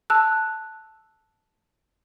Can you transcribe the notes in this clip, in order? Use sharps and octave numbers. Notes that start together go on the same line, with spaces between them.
A5 E6 F#6